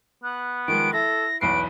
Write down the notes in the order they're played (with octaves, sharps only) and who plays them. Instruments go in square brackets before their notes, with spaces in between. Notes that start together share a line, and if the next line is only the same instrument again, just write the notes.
[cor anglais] B3 [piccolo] F#6
[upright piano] D#3 F3 G#3 [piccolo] D7
[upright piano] E4 [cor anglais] A4 [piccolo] A#6
[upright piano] B1 E2 C7 [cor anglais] B4 [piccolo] D7